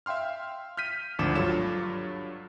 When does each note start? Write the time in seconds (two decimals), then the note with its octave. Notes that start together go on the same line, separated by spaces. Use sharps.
0.06 E5 F5 G5 C6 F6
0.77 F6 G6 B6 D#7
1.19 G#1 D2 F3 D4 D6 E7
1.35 G2 F#3 F4 A4 C#5 E7